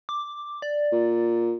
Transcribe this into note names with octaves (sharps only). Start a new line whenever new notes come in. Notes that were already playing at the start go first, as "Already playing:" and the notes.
D6
D5
A#2